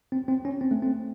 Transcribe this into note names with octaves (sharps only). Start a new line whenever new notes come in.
C4
C4
C#4
C4
A3
C4